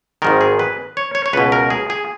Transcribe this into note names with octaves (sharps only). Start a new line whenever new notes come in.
G#1 G#2 D#3 A#4
G#4
B4
C#5
C#5
C#5
C#2 B2 B4
A#4
G#4
G#4